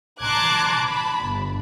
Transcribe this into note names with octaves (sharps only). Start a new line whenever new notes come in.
A5 A#5 C6 D6 F#6 G#6
A5 B5
G1